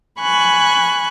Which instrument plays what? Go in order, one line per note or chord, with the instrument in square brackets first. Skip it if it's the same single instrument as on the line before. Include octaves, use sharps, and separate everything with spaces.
[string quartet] G#5 B5 C#6 F#6